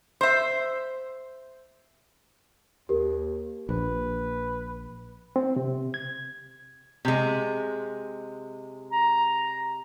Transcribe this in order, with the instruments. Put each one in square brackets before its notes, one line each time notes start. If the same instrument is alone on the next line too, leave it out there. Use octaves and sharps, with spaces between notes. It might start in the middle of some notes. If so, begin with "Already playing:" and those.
[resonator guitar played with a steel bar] C5 E5
[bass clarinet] D#2 [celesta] G4 A#4
[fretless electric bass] A#1 [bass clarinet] B4
[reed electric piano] C4
C3
G#6
[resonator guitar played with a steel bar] C3 G#3
[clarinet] A#5